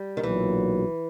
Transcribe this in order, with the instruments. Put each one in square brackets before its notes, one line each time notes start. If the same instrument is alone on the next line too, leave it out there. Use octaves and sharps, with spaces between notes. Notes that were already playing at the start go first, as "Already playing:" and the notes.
Already playing: [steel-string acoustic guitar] G3
D#3
[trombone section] B1 A#2 F#3 [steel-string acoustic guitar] E3